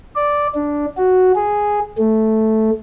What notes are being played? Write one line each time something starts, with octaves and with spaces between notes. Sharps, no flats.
D5
D4
F#4
G#4
A3